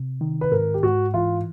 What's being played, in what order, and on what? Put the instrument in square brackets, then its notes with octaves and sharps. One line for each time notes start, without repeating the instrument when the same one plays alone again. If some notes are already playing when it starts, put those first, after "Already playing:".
Already playing: [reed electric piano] C3
D#3
[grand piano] B4
[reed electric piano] G#2 [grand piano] A#4
[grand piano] G4
[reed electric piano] G#2 [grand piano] F#4
[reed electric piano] E3 [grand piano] F4